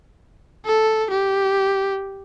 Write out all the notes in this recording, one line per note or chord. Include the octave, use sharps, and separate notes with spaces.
A4
G4